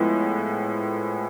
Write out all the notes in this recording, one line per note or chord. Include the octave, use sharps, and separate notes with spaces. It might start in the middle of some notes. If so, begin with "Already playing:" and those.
Already playing: A2 F3 G#3 B3